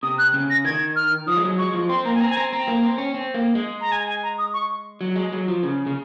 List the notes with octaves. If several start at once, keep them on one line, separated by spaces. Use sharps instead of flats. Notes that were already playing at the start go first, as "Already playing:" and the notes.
C3 D#6
F#6
C#3
A#6
D#3 G#6
F6
F3 D#6
G#3
F#3
G#3 C#6
F3
C4 C6
A#3 A#5
G#5
C4 A#5
G#5
C4 A#5
C4 A#5
A#3
C4
C#4
C4
A#3
G#3
A#5
G#5
G#5
A#5
D#6
C#6
F#3
G#3
F#3
F3
C#3
C#3